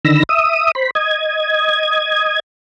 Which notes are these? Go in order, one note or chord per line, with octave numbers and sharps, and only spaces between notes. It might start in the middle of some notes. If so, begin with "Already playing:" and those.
D3 D#3 B5 E6 A#6
E5 D#6
C5 B5
D#5 G#6